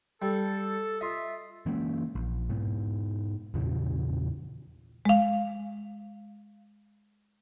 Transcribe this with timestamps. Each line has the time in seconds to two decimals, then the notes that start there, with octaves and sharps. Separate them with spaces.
0.22 G3 A4
1.01 F4 D#5 E5 C6
1.66 E3 G#3 A#3 C#4
2.15 A#1
2.49 G#2 B2
3.54 E2 A#2 C#3 E3
5.05 G#3 F5